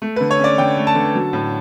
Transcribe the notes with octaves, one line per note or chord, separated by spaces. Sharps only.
A3
B4
D3
C#5
C#4 D5
D3 G5
A3
A5
D3
F#3
A2